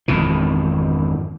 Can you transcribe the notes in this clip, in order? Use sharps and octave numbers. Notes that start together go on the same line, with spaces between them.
G#1 F2 B2 E3